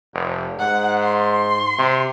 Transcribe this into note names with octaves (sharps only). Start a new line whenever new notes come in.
F1
G#2 F#5
C6
C3